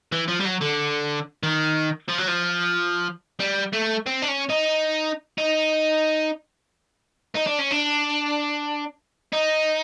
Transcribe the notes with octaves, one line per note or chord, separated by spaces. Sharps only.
E3
F3
G3
F#3
D3
D#3
F3
F#3
F3
G3
A3
C4
D4
C#4
D#4
D#4
D#4
D4
C#4
D4
D#4